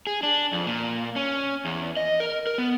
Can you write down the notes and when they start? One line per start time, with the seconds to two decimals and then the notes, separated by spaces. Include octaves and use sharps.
0.07 G#4
0.23 D4
0.52 F2
0.67 A#2
1.16 C#4
1.65 E2
1.97 D#5
2.20 A#4
2.47 A#4
2.58 B3